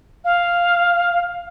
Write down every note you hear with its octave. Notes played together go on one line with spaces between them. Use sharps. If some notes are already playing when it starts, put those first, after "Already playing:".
F5